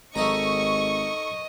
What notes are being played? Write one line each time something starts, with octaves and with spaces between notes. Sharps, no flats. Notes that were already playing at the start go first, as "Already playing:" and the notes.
G#1 A3 D#4 D#5 A#5 C#6